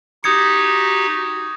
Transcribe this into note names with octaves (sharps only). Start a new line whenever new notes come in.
D#4 F#4 G4 D#6 G#6 C#7